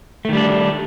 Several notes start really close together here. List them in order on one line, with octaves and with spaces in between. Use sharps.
A3 D#3 G3 D4